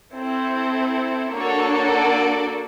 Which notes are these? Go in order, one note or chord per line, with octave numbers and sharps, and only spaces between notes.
C4 E4 A4
A#3 D4 F#4 A4 C#5
D5